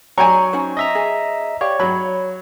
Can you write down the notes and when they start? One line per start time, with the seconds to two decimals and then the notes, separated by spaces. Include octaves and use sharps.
0.18 F#3 D5 G5 G#5 A#5 C#6
0.53 C#4 D#4 C5
0.77 D#5 E5 A#5
0.95 G#4
1.61 G4 C#5 D5 F5
1.80 F#3 B5